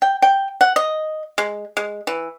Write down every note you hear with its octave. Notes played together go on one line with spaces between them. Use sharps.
G5
G5
F#5
D#5
G#3
G#3
E3